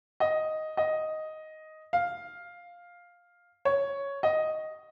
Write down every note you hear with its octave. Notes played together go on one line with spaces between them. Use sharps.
D#5
D#5
F5
C#5
D#5